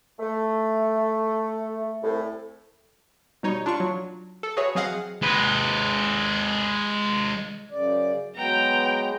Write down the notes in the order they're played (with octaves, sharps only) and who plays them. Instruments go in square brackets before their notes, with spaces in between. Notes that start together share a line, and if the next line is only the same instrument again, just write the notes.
[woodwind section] A3
C2 A2
[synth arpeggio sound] B2 G3 D#4 C#5
D4 F4 C#6
F#3
A4
F#4 G#4 B4 C#5 E5
F#3 C4 G#4 D#5 F5 F#5
[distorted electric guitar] G#3 B4
[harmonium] F#2 C#3 D5
[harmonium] F#3 G#3 B3 [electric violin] G5 A#5